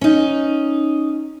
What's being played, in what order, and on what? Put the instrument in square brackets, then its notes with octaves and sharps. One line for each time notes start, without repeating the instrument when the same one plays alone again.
[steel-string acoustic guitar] C#4 D#4